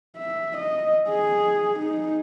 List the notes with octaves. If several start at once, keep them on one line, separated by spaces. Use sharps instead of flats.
E5
D#5
G#4
D#4